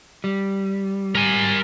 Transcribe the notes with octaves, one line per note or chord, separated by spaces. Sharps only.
G3
A#4 G#5